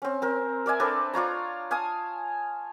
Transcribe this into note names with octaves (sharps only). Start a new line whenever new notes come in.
C4 C#4
C4 A#4
A#4 D5 E5 G#5
C4 D4 A4 B4
D4 F4 C#5 A#5
F5 G#5 A5 D#6